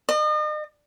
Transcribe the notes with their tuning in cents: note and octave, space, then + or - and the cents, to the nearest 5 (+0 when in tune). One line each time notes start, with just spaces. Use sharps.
D#5 -40